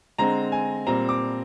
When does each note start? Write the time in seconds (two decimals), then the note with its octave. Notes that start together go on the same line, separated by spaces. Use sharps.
0.18 D3 G#3 C4 A#5
0.52 G#5
0.87 A#2 G3 C4 A#5
1.09 D6